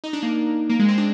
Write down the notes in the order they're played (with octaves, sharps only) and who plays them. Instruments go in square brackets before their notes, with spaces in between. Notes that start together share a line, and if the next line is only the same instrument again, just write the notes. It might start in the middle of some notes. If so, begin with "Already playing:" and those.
[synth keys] D#4
D4
A#3
A#3
G#3
C4
D4